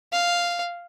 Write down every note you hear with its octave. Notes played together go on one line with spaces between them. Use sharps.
F5